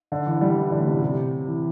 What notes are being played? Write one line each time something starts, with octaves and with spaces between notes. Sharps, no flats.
D3
E3
G3
E3
D3
A2
C3
C3
E3